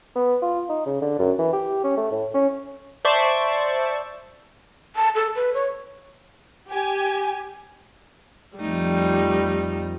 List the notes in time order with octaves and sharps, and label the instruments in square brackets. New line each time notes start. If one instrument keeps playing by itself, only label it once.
[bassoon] B3
F4
D#4
C#3
D3
F#2
E3
G4
C#4
A3
A2
C#4
[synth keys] C5 D5 E5 A5 C#6
[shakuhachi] A5
A4
B4
C#5
[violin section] G4 G#5
[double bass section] F2 F3 [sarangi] G3 [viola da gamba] A3 D#4